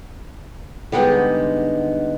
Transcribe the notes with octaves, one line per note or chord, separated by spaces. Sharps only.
D3 G3 G#3 B3 D#4